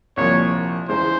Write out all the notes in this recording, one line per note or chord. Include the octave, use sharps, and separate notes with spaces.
C2 A#2 F3 C#5
E2 C#3 E3 G#3 C5